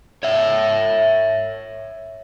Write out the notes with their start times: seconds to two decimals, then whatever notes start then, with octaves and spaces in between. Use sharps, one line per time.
0.23 C#5 E5